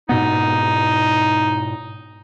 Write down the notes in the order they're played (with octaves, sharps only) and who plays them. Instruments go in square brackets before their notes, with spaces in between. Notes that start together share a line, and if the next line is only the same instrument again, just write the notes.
[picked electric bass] G#2 B2 B3 [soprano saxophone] D#4